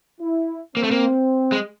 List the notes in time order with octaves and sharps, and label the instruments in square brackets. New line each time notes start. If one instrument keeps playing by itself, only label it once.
[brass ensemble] E4
[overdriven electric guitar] A#3 [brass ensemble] C4
[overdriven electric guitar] A3
A#3
G#3